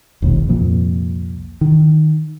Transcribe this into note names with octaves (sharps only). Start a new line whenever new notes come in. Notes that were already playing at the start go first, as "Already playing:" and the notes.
E1 A#1 D#2
C2 F2 A#2
D#3